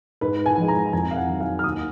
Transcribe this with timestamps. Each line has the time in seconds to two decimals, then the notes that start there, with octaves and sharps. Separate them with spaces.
0.21 G#2 B4
0.46 G#5
0.58 F3 G#3
0.68 A#5
0.93 F2 G#5
1.11 F5
1.16 F#5
1.28 D#3 F#3
1.40 F5
1.59 F6
1.64 D#2 D#6